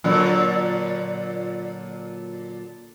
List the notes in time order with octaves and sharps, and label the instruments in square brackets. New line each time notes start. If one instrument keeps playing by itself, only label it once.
[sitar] A#2 D3 F#3